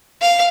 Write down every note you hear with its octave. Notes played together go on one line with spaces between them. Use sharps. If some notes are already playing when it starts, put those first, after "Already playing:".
F5